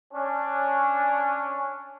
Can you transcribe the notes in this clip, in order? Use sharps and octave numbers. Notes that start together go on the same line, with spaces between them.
C#4 D4